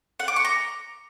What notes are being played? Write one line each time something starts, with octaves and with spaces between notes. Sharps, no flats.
F#5
D6
C#6
A#5